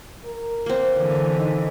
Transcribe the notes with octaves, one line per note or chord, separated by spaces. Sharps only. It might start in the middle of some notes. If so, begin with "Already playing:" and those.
A#4
A#3 C4
D3 E3
D#4